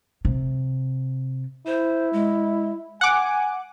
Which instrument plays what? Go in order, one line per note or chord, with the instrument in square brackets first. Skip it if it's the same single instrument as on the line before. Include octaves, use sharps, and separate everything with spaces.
[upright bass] C3
[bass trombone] E4 [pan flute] C5
[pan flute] G#3
[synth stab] F#5 D6 [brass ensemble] G#5